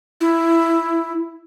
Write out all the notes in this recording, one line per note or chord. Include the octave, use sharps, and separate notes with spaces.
E4